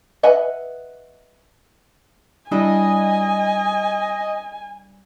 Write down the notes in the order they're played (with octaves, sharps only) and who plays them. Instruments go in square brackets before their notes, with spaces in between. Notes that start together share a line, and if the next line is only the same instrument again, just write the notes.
[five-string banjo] B4 D#5 E5 F#5 G#5
[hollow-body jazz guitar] G3 D4 E4 [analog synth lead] D#5 [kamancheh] G#5